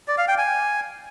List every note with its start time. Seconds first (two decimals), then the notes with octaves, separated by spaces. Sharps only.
0.08 D5
0.18 F5
0.28 G5
0.38 G#5